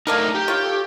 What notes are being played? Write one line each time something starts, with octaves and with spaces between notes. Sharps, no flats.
A3 A#3 D4 D#4 A#4
G4 G6
F4 C#5
A4